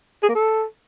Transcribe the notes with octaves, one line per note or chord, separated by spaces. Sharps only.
G#4
A#3
A4